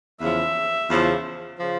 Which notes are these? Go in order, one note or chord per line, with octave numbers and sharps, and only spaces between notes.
E2 C#3 F3 E5
E2 C#3 F3
C#3 F3